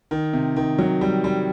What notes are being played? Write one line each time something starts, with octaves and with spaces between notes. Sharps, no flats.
D#3
C3
D#3
F#3
G3
G3